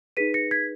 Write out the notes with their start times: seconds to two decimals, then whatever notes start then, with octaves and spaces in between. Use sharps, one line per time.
0.17 D#4 G#4 B4 B6 D#7
0.34 A#6 C#7
0.51 G#6 B6